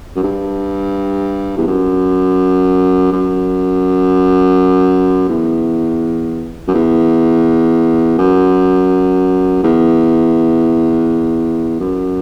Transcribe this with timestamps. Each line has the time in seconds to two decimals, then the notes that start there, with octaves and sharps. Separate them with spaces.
0.16 F#2
0.23 G2
1.57 E2
1.67 F#2
3.13 F#2
5.29 E2
6.68 F#2
6.74 E2
8.18 F#2
9.63 E2
11.81 F#2